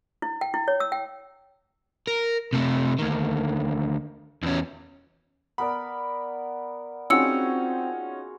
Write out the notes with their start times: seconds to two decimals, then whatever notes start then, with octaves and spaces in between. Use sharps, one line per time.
0.22 E4
0.41 G5
0.54 E4
0.68 C#5
0.80 E6
0.92 G5
2.07 A#4
2.53 C3 A3
2.99 D2 D#3
4.43 E2 C#4
5.58 B3 A#4 D5 B5
7.10 C4 C#4 D#4 F4 F#4 G#4 E6 C#7